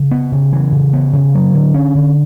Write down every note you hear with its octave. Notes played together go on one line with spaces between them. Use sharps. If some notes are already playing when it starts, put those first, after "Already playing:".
Already playing: C#3
B3
C#3
E3
C#3
B3
C#3
F#3
D3
C#4
D3